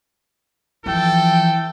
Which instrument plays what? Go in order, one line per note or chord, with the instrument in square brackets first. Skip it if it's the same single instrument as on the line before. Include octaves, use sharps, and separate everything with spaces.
[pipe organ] E3 [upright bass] F3 [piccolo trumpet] A4 [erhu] G5